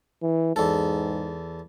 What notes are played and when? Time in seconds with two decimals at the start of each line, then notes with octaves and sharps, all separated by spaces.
0.22 E3
0.56 E2 G#2 A4